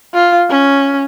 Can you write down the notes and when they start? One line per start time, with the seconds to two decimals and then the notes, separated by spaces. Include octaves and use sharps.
0.14 F4
0.50 C#4